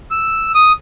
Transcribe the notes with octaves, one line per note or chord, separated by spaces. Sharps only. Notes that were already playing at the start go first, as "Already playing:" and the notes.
E6
D#6